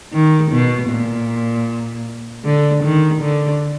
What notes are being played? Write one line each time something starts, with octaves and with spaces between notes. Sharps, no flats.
D#3
B2
A#2
D3
D#3
D3